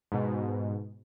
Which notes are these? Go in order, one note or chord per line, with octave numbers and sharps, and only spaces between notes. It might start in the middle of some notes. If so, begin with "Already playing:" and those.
G#2 B2